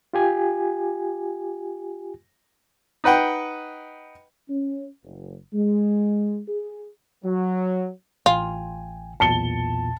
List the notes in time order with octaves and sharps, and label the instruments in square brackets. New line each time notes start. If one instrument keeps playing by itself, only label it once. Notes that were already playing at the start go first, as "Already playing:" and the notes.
[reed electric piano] F4 G4 G#5
[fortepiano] D#4 B4 F#5 G5
[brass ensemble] C#4
F#1
G#3
G#4
F#3
[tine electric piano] A1 G5 G#5 [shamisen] F4
[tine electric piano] B1 E2 A#2 [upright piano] A5 C#7 G7